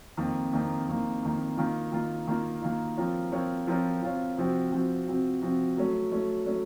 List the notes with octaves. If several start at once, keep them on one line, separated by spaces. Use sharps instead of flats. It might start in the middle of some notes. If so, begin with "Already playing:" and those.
F2 D#3 A#3
F2 D#3 A#3
F2 D#3 A#3
F2 D#3 A#3
D#3 A#3 F4
D#3 A#3 F4
D#3 A#3 F4
D#3 A#3 F4
F3 C4 F4 A#4 C#5
F3 C4 F4 A#4 C#5
F3 C4 F4 A#4 C#5
F3 C4 F4 A#4 C#5
C3 F3 C4 F#4
C3 F3 C4 F#4
C3 F3 C4 F#4
C3 F3 C4 F#4
F#3 A3 C#4
F#3 A3 C#4
F#3 A3 C#4